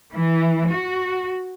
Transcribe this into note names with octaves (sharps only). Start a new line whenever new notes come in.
E3
F#4